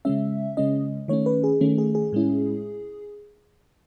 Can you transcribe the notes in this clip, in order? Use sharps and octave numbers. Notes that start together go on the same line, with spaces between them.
C#3 G#3 C#4 E5
C#3 G#3 C#4 D#5
D#3 A3 C#4 C#5
B4
G#4
D#3 A3 C#4
G#4
G#4
A2 G#3 C#4 E4